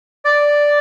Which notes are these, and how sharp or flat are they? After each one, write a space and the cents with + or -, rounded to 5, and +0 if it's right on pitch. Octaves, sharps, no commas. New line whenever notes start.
D5 +0